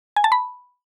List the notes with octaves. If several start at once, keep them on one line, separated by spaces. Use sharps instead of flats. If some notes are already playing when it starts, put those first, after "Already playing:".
G#5
A5
B5